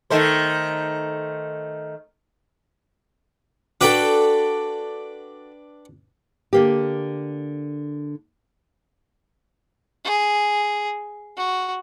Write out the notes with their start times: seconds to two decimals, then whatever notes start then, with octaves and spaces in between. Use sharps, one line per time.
0.10 D#3 A3 C5
3.81 D4 F#4 A4 B4 G5
6.53 D3 A#3 G4
10.04 G#4
11.37 F#4